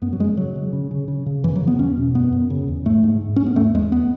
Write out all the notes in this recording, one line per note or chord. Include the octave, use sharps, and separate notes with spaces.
F#2 B3
F#3
F#2 G#3
C#3 F#3
C#3
C#3
C#3
C#3
C#3
F#2 E3
F#3
C#3
B3
E2 C#4
B2
F#2 B3
F#2
C#3
E2
G#2 A3
G#2
G#2
G#2 C#4
B3
E2 A3
E2 G#3
B3